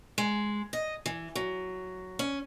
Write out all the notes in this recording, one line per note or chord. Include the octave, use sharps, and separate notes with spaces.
G#3
D#5
E3
F#3
C#4